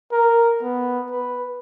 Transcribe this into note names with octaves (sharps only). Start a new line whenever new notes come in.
A#4
B3
B4